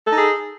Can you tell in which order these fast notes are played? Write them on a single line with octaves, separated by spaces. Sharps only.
A4 D#4 G#4